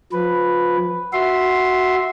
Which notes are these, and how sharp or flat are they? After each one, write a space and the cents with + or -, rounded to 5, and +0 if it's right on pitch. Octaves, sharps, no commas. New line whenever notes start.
F3 +25 B4 +0
F#4 +0 E5 -10 C6 +0